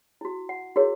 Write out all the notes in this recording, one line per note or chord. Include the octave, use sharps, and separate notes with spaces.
E4 F#4
F#5
E4 F#4 G#4 A#4 C#5